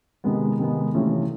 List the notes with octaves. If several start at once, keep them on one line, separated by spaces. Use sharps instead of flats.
C3 D#3 G#3 B3
C3 D#3 G#3 B3
C3 E3 A3 C#4 F4